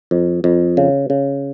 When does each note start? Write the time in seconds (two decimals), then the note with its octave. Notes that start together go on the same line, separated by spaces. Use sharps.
0.11 F2
0.44 F2
0.77 C#3
1.10 C#3